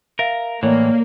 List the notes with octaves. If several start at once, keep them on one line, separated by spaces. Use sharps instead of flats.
A#4 E5 F5
A2 E3 A#3 C#5 D5